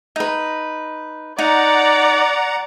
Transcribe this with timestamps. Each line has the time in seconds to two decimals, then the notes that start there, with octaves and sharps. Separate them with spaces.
0.16 D#4 B4
1.39 D#4 D5 F#5 A#5